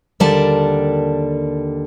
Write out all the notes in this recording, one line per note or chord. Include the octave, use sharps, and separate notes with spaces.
D#2 D3 G3 A#4 D5 A5